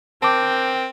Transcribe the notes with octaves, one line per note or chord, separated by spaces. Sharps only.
C4 A#4 G5 A5 D6